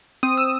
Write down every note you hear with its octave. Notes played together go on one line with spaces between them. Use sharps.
C4 D#6
E6